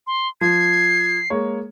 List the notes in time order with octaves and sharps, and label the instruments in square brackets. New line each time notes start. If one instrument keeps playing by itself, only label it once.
[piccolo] C6
[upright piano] F3 [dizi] G#6 [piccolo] C7
[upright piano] G#3 A#3 C#5